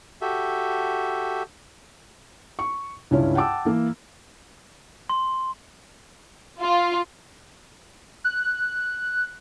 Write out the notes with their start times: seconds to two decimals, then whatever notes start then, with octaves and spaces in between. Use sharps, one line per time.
0.22 F#4 G4 A4 E5
2.59 C#6
3.11 C#2 G2 C#4 E4 F4
3.35 F#5 G5 A5 D6 E6
3.65 E3 A#3
5.10 C6
6.60 F4
8.24 F#6